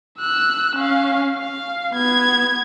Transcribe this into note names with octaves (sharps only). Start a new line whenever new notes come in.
E6 F#6
C#4 F5
F5
B3 G#6